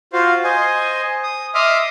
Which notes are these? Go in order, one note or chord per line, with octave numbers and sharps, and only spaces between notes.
F4 F#4 C5 F5
C5 D#5 G#5
D#6
D#5 E5 C6 D6 D#6 F6